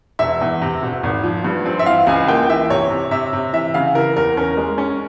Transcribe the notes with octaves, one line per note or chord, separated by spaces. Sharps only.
E1 E5
E2
C3
E1
G#1
F3
G2
C4
E5
E3 F5
C#2 G#5
A#3 G5
E3 E5
C3 C#5
C3
C3 E5
C3
E3 E5
C#3 F5
E3 A#4
E2 A#4
C#4 A#4
G#3
C#4